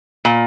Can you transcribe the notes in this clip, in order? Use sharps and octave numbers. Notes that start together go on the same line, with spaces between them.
A#2